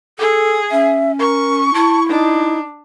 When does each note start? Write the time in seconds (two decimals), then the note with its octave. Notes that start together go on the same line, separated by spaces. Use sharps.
0.19 G#4 A4
0.71 C#4 E5
1.19 A#4 C#6
1.74 E4 A5
2.09 D4 D#4